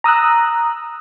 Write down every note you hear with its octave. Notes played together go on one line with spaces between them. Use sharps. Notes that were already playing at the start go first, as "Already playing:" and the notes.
A#5 D#6 E6 F#6